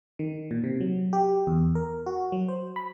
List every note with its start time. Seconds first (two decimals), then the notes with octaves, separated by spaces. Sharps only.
0.19 D#3
0.51 A#2
0.64 C3
0.81 F#3
1.13 G4
1.47 E2
1.75 A#4
2.06 F#4
2.32 F#3
2.48 C5
2.76 B5